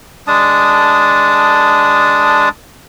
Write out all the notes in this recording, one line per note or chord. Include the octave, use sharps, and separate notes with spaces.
G#3 D4 A5 D#6